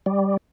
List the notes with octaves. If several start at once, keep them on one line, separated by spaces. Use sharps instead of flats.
G3